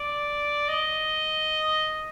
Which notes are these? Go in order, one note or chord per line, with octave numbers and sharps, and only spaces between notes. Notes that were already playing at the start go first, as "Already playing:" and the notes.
Already playing: D5
D#5